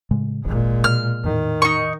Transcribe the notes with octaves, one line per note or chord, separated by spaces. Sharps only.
A2 C#3 G#3
D1 G#1 A#2 G#3
B2 F6
E2 A2 D#3
D#4 C#6